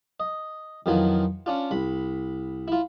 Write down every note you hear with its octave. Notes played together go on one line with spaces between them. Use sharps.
D#5
F2 D#3 E3 F#3 F4 G#5
C#4 D4 F4
C2 B5
E4 F4